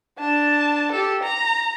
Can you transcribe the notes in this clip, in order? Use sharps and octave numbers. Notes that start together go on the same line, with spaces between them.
D4 A5
G4 A4
A#5